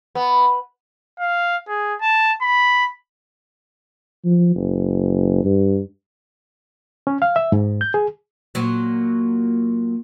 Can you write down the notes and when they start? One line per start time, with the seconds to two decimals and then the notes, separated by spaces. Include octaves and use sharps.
0.15 B3
1.19 F5
1.68 G#4
2.01 A5
2.41 B5
4.25 F3
4.56 F#1
5.44 G2
7.07 C#4
7.22 F5
7.36 E5
7.52 G#2
7.81 G6
7.94 G#4
8.55 A#2 F#3